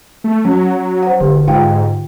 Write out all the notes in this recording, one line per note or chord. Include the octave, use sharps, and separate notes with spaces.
A3
F#3 C#4
C5 F#5
E1 D3 G4
G#2 F4 F5 G5